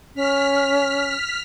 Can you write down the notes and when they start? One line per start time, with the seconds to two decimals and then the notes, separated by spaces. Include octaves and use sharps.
0.15 C#4 F6 B6